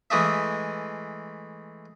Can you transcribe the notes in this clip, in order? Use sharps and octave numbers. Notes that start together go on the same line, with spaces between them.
E3 G#3 A3 E5